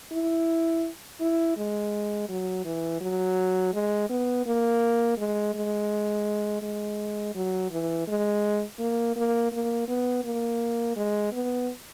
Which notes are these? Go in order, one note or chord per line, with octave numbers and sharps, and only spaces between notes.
E4
E4
G#3
F#3
E3
F#3
G#3
B3
A#3
G#3
G#3
G#3
F#3
E3
G#3
A#3
A#3
A#3
B3
A#3
G#3
B3